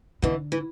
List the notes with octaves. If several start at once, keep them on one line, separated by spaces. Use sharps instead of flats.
B2 D3 E3
E3